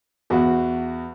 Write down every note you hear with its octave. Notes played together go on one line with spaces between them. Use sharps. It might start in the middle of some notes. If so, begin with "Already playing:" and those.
E2 F#4 F#5